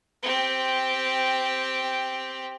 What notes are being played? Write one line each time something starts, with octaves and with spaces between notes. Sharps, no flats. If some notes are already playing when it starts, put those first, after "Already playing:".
C4 G4